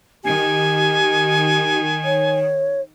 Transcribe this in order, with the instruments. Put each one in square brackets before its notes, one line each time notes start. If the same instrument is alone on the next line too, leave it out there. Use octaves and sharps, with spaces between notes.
[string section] D#3 [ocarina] G4 [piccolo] G#5
[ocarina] C#5